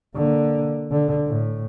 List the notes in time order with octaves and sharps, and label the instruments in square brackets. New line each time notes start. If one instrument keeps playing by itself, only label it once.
[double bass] D3 A#3
D3
A2